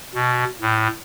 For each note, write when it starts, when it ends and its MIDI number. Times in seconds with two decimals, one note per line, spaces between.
0.15 0.44 47
0.62 0.88 45